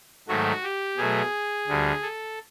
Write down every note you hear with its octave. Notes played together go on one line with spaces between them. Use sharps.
G#2 D#3 F#3 A3 F#4
G4
B2 F#3 A3 G#4
D2 D3 G3
A4